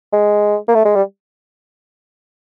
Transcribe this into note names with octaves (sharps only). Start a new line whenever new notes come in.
G#3
A#3
A3
G#3
G3